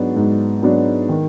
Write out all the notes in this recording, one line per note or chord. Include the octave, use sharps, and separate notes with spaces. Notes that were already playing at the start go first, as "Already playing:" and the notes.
Already playing: G#2 F#3 B3 D4 F#4
G#2
F#3 B3 D4 F#4
D#3